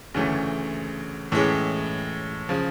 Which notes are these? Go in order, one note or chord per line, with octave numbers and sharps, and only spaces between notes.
D2 C#3 E3 A3 C#4
A2 E3 G#3 C#4
C#3 F3